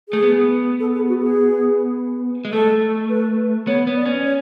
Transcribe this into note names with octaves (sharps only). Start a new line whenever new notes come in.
A3 G#4
B3
A4
G#4
F#4
G#4
G#3
A3 A4
B4
B3 C#5
B3
D5
C#4
C#5